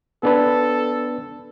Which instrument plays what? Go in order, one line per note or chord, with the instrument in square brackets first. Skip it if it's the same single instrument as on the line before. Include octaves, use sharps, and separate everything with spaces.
[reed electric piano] B3 D4 B4 [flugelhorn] A4